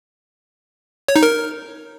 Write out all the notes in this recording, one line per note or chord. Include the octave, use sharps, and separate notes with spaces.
C#5
D#4
A#4